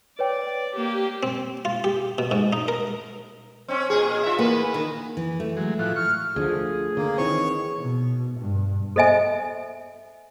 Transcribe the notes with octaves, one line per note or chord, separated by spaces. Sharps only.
B4 C#5 D5 G5
A#3 G4
C4
F4
G4
B2
G#2
D#4
A#4
C4 C#4
A#2 G#4
F4 E5
E3 A#3 B3 B4
D#3
E3
A3
F#3 G#3
A2 E3 F3 F#6
C#6 F6
D2 D3 F3 G#4
D3 A#3
D#3 E3 C4 C#5 C#6
B2
G2
A4 C5 D#5 E5 G#5